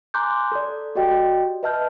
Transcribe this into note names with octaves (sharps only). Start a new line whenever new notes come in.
G#5 A#5 C6 D6 F#6 G6
A4 D5
F#4 G4 D5 D#5 G5
B4 D#5 E5 A5 F6 G6